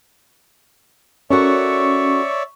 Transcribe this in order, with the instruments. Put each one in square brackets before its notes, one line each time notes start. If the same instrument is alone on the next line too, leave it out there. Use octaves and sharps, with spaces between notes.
[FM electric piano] C#4 [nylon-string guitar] F#4 A4 A#4 [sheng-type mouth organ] C#5 D5 E5 [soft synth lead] C#6